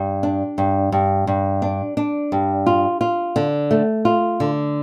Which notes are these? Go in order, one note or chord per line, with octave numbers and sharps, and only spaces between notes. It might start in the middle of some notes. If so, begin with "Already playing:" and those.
Already playing: G2
D4
G2
G2
G2
D4
D4
G2
F4
F4
D3
A3
F4
D3